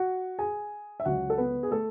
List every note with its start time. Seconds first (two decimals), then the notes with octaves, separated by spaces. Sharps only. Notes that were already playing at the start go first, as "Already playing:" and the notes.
Already playing: F#4 F#5
0.39 G#4 G#5
1.00 E5
1.05 C#2 C#3 F#3 F#4 F#5
1.30 A4
1.38 B3 B4
1.63 G#4
1.71 A3 A4